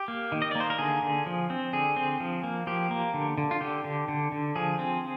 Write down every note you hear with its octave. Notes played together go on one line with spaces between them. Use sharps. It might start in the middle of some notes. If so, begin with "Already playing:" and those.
Already playing: G4
A#3
D#3
D#5
A#3 D5
C5
A#4
D3 G#4
D3
F3
C4
D3 G#4
C4
F3
A#3
F3 G4
A#3
D3
D3
F4
D3 G4
D3
D3
D3
F3 G#4
C4